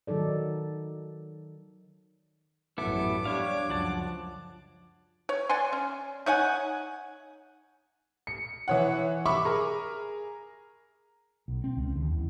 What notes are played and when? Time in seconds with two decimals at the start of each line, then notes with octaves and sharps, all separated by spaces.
0.07 D#3 F#3 D#4 A4 D5
2.78 A1 F#2 B3 E4 A4 D6
3.25 G3 D4 C#5 F5
3.69 C#2 F#2 F3 F#5 A5
5.29 C#5
5.49 D5 F#5 G#5 C6
5.73 C#4
6.26 D#4 C#5 F#5 G#5
8.27 C#7
8.68 E3 C#5 F#5
9.26 E5 B5 C#6 D6
9.45 G#4 A#4
11.48 B1
11.64 C4
11.77 C#2
11.96 D#2
12.12 E2